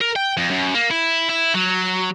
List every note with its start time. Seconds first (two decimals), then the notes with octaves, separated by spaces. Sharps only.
0.01 A#4
0.16 G5
0.37 F2
0.50 F#2
0.74 A#3
0.91 E4
1.29 E4
1.54 F#3